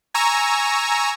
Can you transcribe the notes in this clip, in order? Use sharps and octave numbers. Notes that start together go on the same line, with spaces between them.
G#5 A#5 C#6 E6